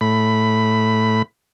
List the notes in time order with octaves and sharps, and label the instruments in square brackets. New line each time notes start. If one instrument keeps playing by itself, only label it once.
[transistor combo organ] A2 B5